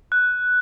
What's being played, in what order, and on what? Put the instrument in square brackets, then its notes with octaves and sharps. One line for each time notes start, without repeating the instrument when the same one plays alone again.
[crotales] F#6